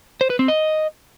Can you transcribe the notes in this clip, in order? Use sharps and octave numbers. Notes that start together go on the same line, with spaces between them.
C5
B4
C4
D#5